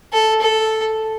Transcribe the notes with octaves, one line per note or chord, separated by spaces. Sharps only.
A4
A4